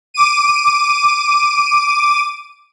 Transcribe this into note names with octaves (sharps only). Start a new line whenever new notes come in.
D6 D#7